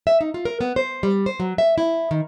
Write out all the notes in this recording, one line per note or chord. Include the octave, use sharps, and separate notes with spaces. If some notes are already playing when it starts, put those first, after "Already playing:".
E5
D#4
F4
A#4
B3
C5
G3
C5
F#3
E5
E4
D#3